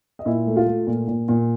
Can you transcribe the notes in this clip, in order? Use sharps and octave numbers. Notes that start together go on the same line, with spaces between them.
D#5
A#2 E4 E5
A3
F4 F5
A3
A#2
A#2
A#2